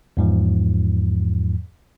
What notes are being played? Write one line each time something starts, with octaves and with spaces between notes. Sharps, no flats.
E2 G#2 F3